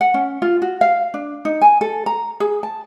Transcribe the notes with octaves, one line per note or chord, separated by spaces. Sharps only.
F#5
C#4
F4
F#4
F5
D4
D#4
G#5
A4
A#5
G#4
A5